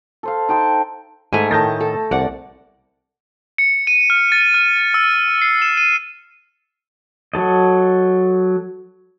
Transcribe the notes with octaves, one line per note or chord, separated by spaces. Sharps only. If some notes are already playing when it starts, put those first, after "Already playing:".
A4 C5 F5
D#4 G5 A5 C6
G#2 A3 G#5
A2 D#3 A5 G6 A#6
A4
C2 D5 F#5
C#7
D#7
F6
A6
F6
E6
C7
E7
D#7
F#3 A4 D#5